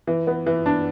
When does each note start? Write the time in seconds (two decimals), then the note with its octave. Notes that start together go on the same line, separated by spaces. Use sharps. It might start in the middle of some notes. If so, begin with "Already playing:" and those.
0.07 E3
0.27 B3
0.46 E3
0.66 D4